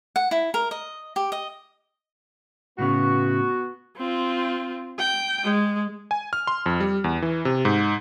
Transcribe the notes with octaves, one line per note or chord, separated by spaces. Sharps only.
F#5
E4
A#4
D#5
G4
D#5
A2 C#3 B3 C#4 F#4
C4 F4
G5
G#3
G#5
F6
C6
F2
G3
E2
E3
C3
G#2